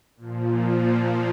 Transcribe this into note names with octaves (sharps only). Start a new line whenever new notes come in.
A#2 F3